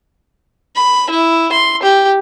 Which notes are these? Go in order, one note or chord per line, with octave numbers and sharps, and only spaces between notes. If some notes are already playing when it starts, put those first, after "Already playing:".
B5
E4
C6
G4